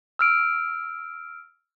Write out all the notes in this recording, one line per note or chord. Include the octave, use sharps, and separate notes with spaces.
E6 F6 D7